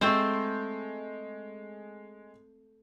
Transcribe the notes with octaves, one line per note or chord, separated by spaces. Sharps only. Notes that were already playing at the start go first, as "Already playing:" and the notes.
G#3 A3 C4 C5 G6